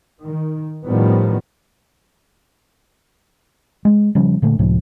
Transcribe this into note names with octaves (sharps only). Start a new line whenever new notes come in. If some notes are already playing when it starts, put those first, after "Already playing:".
D#3
A2 D#3 F3 G3 B3
G#3
C#3 F3 G3
A#2 D3 A3
C#2 A2 C3 F3